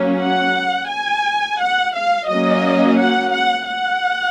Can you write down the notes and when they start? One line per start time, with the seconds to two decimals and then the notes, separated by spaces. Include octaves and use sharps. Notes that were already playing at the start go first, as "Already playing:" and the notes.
Already playing: F#3 A#3 C#4
0.21 F#5
0.91 G#5
1.61 F#5
1.96 F5
2.30 F#3 A#3 C#4 D#5
2.99 F#5
3.34 F#5
3.69 F#5